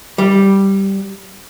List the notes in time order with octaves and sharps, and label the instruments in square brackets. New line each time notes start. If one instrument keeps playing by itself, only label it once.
[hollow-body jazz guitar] G3